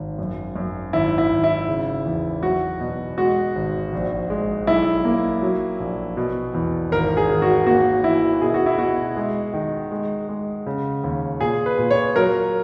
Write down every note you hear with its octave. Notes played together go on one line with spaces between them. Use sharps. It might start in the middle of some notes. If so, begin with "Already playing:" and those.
Already playing: G#1
F#2
F#2
G#1 E4
E4
G#1
E4
C#3
E2
F#3 F#4
B2
G#3 F#4
G#1
A#1
G#3
B1 E4
A#3
F#3
A#1
B2
E2
G#1 A#4
G#4
G#1
F#4
A#3 F#4
E3 E4
B2 G#4
F#4
E4
B2 F#4
G#3
D#3
G#3
G#3
C#3
D#2
A#2 G#4
B4
A#2
C#5
F#3 A#4